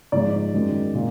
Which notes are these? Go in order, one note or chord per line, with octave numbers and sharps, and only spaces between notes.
G#2 F3 G#3 D5
F#2 D#3 G#3
A#2